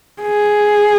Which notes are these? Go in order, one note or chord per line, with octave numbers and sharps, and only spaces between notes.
G#4